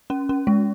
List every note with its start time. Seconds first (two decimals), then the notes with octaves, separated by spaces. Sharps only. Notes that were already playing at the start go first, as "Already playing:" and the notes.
0.10 C#4
0.29 C#4
0.47 G#3